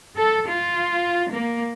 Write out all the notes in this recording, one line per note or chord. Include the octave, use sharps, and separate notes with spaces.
A4
F4
A#3